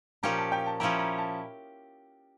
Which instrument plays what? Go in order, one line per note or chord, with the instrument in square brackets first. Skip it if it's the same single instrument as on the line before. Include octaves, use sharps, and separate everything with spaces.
[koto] A#2 F3 C#4 G4 [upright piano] A#5
[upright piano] A5
G5
A5
[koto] F3 C#4 E4 G4 [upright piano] A#5
[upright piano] A#5
A5